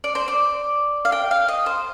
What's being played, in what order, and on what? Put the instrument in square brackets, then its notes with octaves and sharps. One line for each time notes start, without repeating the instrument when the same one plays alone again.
[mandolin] D5
C5
D5
F5
G5
F5
D#5
C5